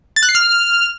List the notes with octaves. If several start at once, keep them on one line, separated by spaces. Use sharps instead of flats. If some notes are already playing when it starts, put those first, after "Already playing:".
A6
F#6
C7
F6